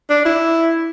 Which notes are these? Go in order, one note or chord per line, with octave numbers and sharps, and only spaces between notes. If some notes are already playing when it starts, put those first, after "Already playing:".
D4
E4